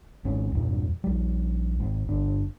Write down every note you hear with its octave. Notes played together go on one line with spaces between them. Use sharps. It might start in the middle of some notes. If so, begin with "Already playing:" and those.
G#1 G#2 C#4
E2 G2 A#2
A#1 G3
G#1
G1 D4